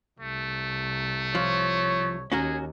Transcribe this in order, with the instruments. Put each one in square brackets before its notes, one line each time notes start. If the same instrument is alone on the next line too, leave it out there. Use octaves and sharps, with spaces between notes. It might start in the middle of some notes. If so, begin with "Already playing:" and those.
[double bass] C2 [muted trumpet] A3
[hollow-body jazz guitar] F3 [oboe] C#5
[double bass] D#2 [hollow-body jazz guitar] C#4 F#4 A#4 [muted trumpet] G#4